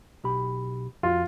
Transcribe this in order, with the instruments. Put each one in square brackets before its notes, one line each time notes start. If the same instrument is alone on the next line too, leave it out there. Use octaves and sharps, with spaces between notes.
[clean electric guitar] B1 G4 B5
[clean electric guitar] F2 F#4 [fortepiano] F4